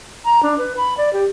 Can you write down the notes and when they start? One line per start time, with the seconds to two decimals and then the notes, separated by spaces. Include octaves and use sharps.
0.25 A#5
0.43 D4
0.58 B4
0.77 B5
0.98 D5
1.13 G4